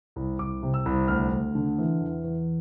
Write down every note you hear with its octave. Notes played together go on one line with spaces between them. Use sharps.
C2
C2 D6
C3
E6
C2
D2 F6
D2
D3
E3
E2
E2